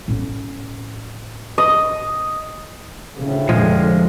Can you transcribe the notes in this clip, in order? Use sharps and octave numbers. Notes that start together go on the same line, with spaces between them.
A2 C#4
D#5
D2 A2 C#3
F1 A#2 D3 F3 G#3